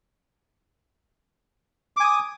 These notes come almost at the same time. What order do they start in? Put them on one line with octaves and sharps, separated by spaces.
D6 G#5 D#6